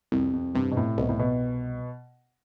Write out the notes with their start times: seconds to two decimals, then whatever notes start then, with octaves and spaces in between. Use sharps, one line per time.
0.12 C2 F2
0.33 F2
0.55 G2 C3
0.71 B2
0.77 A2
0.98 C2 B2
1.09 A2
1.19 B2